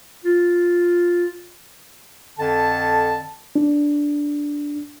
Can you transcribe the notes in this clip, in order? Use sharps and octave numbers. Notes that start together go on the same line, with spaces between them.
F4
F2 D3 A5
D4